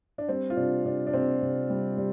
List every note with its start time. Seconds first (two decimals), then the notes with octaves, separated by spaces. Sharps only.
0.18 D4
0.28 G3 C4
0.50 F4
0.57 C3 D4
0.85 C3 D4
1.07 D4
1.14 C3 C4
1.42 C3
1.70 G3
1.97 G3